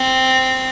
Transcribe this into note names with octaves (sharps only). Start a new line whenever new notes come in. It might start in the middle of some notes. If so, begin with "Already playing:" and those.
Already playing: C4